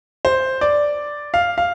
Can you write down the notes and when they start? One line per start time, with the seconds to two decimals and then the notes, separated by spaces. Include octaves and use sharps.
0.25 C5
0.61 D5
1.34 F5
1.58 F5